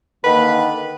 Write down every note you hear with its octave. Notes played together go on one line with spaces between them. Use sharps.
D3 D#3 A#3 B4